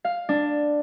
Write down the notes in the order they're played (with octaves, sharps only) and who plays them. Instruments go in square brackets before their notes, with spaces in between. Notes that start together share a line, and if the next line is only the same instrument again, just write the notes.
[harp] F5
D4